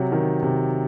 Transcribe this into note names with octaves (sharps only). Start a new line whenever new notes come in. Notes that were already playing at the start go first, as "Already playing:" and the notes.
Already playing: C3 F#3
D#3
C3